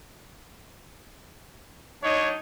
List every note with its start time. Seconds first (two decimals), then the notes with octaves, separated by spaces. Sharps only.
2.03 F#3 D4 D#4 C#5